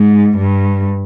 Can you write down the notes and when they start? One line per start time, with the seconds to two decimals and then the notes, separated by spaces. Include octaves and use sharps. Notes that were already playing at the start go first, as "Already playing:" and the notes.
Already playing: G#2
0.37 G2